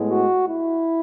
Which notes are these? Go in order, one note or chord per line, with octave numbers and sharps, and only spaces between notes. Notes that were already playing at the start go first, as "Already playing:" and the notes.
Already playing: A2 G#3 B3
F#4
E4